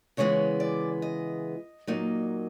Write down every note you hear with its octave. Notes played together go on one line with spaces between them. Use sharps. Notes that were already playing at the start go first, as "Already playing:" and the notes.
C#3 E3 G#3 B3 E4 C#5
D5
D#5
A#2 F#3 A#3 D#4